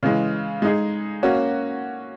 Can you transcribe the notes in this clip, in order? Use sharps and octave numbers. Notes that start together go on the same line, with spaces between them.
C#3 E3 G#3
G#3 D#4 G#4
A#3 C#4 F#4